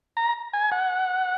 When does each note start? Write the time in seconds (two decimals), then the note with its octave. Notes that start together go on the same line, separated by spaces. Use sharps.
0.17 A#5
0.53 G#5
0.72 F#5